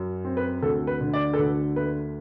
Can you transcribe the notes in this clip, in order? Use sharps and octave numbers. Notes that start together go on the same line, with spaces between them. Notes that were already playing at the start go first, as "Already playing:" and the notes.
Already playing: F#2
C4
B4
D2 A4
B4
D3
D5
A4
D2 B4
A3 B4